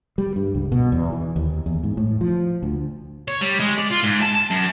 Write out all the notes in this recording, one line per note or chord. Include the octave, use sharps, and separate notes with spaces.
G3
G2
C#2
B2
E2
E3
D#2
E2
G#2
A2
F3
D2
C#5
G3
G#3
D5
F4
G#2
A5
A5
F#2